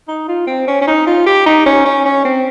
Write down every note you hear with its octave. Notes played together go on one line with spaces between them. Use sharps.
D#4
F4
C4
C#4
C#4
D#4
F4
G4
D#4
C#4
C#4
C#4
C4